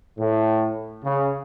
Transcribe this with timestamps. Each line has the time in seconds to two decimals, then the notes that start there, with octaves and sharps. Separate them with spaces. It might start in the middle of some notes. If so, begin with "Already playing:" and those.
0.18 A2
1.05 C#3